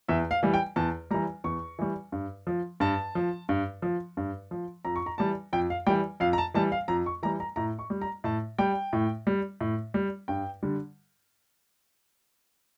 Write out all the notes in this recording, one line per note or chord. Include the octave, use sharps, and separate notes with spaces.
E2 E5
F5
E3 G3
G5
E2 A5
E3 G3 A#5
E2 C#6
E3 G3
G2
F3
G2 A5
F3
G2
F3
G2
F3
F2 A#5
C#6
A#5
E3 G3 A5
F2 G5
F5
E3 G3 G5
F2 F5
A#5
A5
E3 G3 A5
F5
F2 A#5
C#6
E3 G3 A#5
A#5
A2 A#5
C#6
G3
A#5
A2 A5
G3 G5
A2
G3
A2
G3
G2 G5
D3 G3